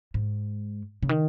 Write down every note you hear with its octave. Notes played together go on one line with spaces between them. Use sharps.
G#2
C#3
D#3